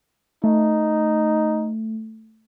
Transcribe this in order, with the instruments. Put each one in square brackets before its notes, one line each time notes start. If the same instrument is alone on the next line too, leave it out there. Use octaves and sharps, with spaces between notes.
[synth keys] A3 [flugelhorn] D#4